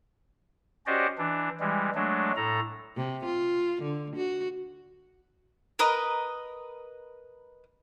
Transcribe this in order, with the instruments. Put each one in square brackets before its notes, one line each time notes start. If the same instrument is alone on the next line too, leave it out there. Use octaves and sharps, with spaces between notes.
[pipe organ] C#4 F#4 G4 C5 D5 D#5
E3 D4
E3 G3 G#3
F#3 G#3 A3 D4
A2 A4 A#5
[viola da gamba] C3
F4
D3
F#4
[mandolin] A#4 B4 D#5